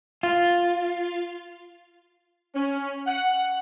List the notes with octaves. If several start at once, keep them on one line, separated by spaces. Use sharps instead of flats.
F4
C#4
F#5